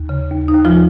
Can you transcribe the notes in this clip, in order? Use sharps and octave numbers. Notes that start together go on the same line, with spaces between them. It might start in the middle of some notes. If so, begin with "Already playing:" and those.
Already playing: D#2
C#3
D#2
D#4
D#2
F3 F4